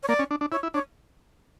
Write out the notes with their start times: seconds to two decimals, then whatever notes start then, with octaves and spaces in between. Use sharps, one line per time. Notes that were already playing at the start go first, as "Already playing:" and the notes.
0.03 C#5
0.08 A#3 D5
0.19 C#4
0.31 D4
0.41 D4
0.52 E4 C#5
0.63 E4
0.74 D4 C#5